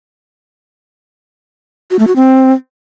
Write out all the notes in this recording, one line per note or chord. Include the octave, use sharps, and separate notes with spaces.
F#4
A3
F#4
C4